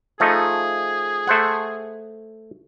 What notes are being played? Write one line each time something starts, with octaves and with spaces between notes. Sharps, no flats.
F3 A3 D#4 G#4
A3 C5 F#5